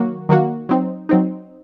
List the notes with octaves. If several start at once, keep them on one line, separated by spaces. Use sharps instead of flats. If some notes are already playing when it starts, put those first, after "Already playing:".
Already playing: D#3 F#3 A#3 F#4
D#3 F#3 A#3 F#4
F#3 C4 D#4
F#3 C4 D#4